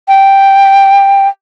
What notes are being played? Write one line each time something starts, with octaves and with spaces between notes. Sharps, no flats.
G5